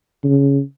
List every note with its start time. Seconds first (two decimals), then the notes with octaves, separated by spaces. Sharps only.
0.24 C#3